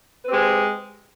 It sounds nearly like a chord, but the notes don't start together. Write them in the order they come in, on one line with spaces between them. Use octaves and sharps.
B4 C4 G4 G#3